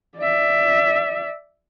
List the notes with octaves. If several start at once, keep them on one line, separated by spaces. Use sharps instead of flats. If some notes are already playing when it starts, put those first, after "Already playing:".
D5 E5